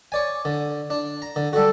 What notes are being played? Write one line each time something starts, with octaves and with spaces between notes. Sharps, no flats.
C#5 D5 G#5
D3
D4
A#5
D3
G3 F#4 A4